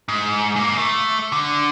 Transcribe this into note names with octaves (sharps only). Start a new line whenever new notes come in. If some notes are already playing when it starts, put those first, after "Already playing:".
G#2
G#2 A#3
A3
D3